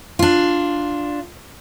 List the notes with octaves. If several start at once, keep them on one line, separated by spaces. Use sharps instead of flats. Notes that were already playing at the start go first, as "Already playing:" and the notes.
D4 F4